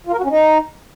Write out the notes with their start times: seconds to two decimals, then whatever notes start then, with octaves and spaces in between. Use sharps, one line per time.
0.07 F4
0.13 A#4
0.18 F#4
0.24 C#4
0.30 D#4